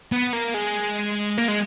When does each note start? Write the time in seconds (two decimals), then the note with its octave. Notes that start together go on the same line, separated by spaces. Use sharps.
0.12 B3
0.33 A#3
0.54 G#3
1.38 A#3
1.48 G#3